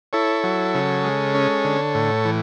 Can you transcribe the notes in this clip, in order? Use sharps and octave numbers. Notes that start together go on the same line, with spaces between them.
E4 A4 C#5
F#3
C#3
G#3
C#4
D3
A2
E3